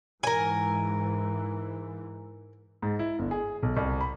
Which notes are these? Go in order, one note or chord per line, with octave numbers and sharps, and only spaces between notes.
G#2 E3 A#4 G#5
G#2
E4
G1
G#4
B1
C2
B5